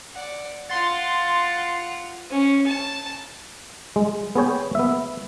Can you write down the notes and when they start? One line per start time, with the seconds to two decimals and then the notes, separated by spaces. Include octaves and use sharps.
0.13 D5 F#5
0.69 F4 F#5 C6 A6
2.31 C#4
2.67 A5
3.96 G#3
4.35 B3 G#4 C#5 G5
4.75 B3 E5